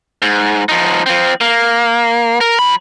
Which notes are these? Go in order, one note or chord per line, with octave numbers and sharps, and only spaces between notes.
G#2
F3 D#4
F3 C4
A#3
A#4
F#3 B5